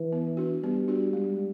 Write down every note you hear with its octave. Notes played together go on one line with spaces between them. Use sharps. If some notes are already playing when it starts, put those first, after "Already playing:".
Already playing: E3
B3
D4 F#4
G3 B3
D4 F#4
G#3